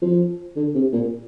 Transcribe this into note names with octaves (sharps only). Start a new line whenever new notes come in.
F3
D3
C3
A#2